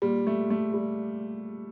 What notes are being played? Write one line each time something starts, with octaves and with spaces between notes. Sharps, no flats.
A#2 G3
A3
A3
G3